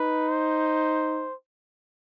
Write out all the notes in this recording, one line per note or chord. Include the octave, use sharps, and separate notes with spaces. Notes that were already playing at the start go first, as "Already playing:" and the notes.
Already playing: D#4 B4
C5